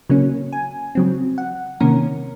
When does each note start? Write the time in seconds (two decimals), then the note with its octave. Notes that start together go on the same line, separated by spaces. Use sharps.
0.10 C#3 F#3 A#3 C#4
0.53 G#5
0.95 C#3 F#3 C4
1.38 F#5
1.80 C3 D#3 A#3 C#4 A#4